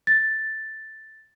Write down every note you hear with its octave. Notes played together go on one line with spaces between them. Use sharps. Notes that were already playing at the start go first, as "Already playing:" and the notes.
A6